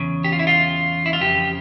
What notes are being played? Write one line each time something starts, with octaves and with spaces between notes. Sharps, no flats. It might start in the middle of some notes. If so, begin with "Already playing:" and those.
Already playing: E2 C#3
G4
F4
E4
F4
E4
F4
F2 C#3 G4